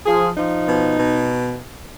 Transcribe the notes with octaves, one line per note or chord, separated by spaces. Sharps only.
F3 G#4
F3 D#4
B2
B2